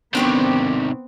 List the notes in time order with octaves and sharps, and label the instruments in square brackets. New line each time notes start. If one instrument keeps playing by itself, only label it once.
[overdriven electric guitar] C3 D#3 [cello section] B3 C4 [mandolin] D4 G4 C#5